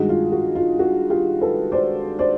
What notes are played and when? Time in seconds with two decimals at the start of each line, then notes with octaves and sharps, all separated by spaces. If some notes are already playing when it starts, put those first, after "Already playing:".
Already playing: G2 D#3 G#3 F#4
0.09 F4
0.32 F#4
0.55 F4
0.79 F#4
1.10 F4 G4
1.41 A4 B4
1.72 C5 D5
2.19 C5 D5